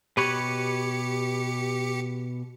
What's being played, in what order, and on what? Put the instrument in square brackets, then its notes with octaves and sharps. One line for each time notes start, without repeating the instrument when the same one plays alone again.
[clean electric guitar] B2 B4 C#5 [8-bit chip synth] G4 C#7